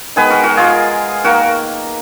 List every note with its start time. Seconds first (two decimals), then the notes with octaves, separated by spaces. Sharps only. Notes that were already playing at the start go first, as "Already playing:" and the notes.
0.16 D#3 G#3 B3 G#4 B4
0.30 F#4 A#4
0.44 F#4 A#4
0.57 F4 G#4
1.24 D#3 A#3 F#4 A#4